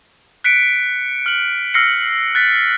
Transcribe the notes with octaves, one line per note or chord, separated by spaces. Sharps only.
F#6 B6 C#7 D7
F6 F#7
E6 F6 A#6 C7 C#7
F#6 A6 B6